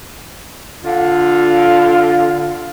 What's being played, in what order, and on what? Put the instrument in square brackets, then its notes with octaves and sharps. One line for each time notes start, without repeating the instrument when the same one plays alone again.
[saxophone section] D3 F4